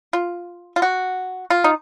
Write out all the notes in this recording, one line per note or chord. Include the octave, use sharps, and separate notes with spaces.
F4
F4
F#4
F4
D#4